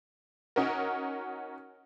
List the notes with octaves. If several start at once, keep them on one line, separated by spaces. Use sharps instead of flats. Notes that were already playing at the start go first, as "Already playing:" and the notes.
C#4 D#4 F#4 A#4